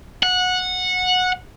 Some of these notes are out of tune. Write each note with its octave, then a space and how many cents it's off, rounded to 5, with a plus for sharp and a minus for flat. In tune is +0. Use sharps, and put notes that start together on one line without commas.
F#5 -15